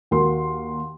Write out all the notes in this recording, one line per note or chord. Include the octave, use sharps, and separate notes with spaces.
D#2 F#4 A#4 C6